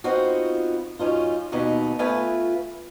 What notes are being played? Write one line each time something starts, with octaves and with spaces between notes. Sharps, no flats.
B3 C4 D#4 F4 F#4
F#2 C#4 D#4 F4
D#2 B2 B3 D#4
A3 B3 F4 B4 E5 G#5